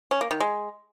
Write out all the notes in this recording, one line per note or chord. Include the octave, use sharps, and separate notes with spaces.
C#4
A#3
D#3
G#3